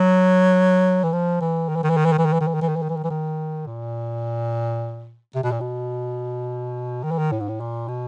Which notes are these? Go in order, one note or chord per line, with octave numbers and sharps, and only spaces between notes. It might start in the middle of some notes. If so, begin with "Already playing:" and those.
Already playing: F#3
E3
F3
E3
D#3
E3
D#3
E3
D#3
E3
D#3
E3
D#3
E3
D#3
E3
D#3
E3
D#3
E3
D#3
E3
D#3
E3
D#3
A#2
C3
B2
A#2
B2
D#3
E3
D#3
A2
G#2
A2
A#2
B2